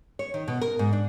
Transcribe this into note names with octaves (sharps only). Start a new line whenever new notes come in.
C#5
D#3
B2
A#4
G#2
D4